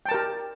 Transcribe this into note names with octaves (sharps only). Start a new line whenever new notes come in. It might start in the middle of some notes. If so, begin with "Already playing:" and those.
G4 A#4 G5 A5